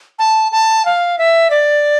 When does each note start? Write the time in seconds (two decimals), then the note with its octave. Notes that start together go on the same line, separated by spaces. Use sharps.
0.19 A5
0.52 A5
0.85 F5
1.19 E5
1.50 D5